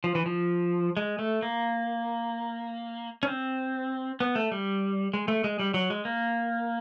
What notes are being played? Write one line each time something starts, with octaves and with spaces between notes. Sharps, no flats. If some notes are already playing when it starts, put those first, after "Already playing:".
F3
E3
F3
G#3
A3
A#3
C#4
C4
B3
A3
G3
G#3
A3
G#3
G3
F#3
G#3
A#3